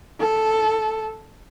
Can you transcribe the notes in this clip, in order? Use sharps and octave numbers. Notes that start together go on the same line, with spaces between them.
A4